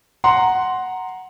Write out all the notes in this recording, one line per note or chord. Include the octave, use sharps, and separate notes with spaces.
F#5 A#5 C6